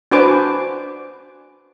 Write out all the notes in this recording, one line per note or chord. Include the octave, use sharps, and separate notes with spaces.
D4 F#4 B4 C5 G#5 D6